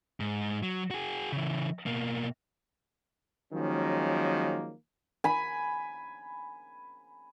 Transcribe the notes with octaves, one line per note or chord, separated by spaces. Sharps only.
G#2
F#3
F#4 G#4
C#3 E3
B2 A#3
D#3 F3 F#3 G#3 A#3 C#4
G#5 B5